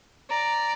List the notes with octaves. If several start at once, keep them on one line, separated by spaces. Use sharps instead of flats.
D5 A#5